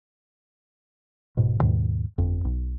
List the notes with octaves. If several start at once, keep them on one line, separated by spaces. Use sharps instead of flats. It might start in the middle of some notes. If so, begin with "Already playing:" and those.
D1 G#2 B2
D#2 G#2 B2 D#3
G1 F2
B1